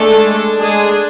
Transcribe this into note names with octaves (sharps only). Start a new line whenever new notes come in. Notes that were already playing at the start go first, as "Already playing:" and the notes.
Already playing: G#3 A3 D4 A4
G#3 G#4